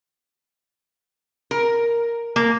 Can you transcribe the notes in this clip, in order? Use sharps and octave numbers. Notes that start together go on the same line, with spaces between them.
A#4
A#3